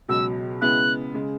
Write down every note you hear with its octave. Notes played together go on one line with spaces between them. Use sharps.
C#2 B2 F#3 E6
C#3 G#3 B3 E4 F#6
C#3 G#3